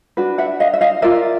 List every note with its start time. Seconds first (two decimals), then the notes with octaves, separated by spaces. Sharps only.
0.17 D4 F#4 B4
0.38 E5 F#5
0.60 D#5 F5
0.74 E5
0.81 D#5 F5
1.02 F4 A#4 D5 E5